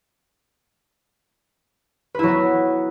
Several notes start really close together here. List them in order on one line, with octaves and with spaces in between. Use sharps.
B4 E4 F#3 B3